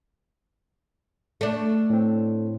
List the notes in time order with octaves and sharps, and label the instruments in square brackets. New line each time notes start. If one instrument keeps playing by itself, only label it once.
[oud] A3 D4
[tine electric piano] A2 C4